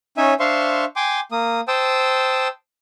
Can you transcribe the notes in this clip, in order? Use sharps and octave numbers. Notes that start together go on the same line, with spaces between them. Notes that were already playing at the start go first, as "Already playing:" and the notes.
C#4 D#4 C#5 E5 G#5
D4 C5 E5 F5 C6 C#6
G5 G#5 C6 D6
A#3 D#6
C5 G5 A5 D#6 E6